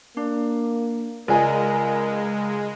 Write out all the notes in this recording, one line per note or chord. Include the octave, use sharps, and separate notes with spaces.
A#3 D4
C#2 G#3 A#4 D5 D#5 G#5